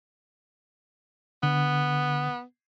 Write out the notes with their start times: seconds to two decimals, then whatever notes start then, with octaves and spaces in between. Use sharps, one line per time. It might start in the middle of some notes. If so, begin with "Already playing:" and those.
1.43 D3 B3